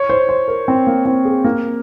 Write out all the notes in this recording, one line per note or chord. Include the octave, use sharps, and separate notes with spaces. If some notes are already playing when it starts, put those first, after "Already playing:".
Already playing: C#5
C5
C5
A#4
C4
A#3
C4
G#4
A#3